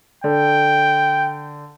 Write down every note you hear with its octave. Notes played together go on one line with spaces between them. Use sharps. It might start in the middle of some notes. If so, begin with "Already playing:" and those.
D3 G5